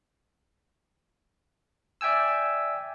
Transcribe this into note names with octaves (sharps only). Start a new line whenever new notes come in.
D5 E5 G5 G#5 E6